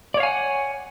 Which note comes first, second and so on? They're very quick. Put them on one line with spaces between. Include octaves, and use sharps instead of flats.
D5 C#5 F5 G#5 F#5